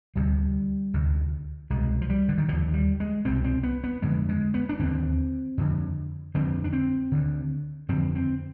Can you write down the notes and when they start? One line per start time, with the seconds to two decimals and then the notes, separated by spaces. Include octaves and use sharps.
0.16 D2 C3 G3
0.94 D2 C3
1.70 C2 B2 G#3
2.01 F3
2.10 G3
2.29 D3
2.38 D#3
2.48 D#2 D3 F3
2.73 G3
3.00 G#3
3.25 C2 B2 C4
3.44 C4
3.63 B3
3.84 B3
4.02 F2 D3 G#3
4.29 G#3
4.54 B3
4.69 D4
4.79 D#2 D3 C4
5.58 F2 D3
6.34 F2 D3 C4
6.64 D4
6.73 C4
7.12 D2 D3
7.89 F2 D3 C4
8.15 C4